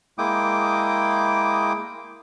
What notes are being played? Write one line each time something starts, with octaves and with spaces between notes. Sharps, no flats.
G#3 A#3 E4 G5 D6 D#6